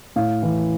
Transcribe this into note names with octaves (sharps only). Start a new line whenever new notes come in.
A2 F5
E3